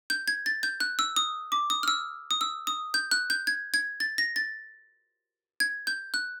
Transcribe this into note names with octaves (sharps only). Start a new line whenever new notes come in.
G6
G#6
A6
G6
F#6
E6
D#6
D6
D#6
F6
E6
D#6
E6
D#6
G6
F#6
G6
G#6
G#6
A6
A#6
A6
G#6
G6
F#6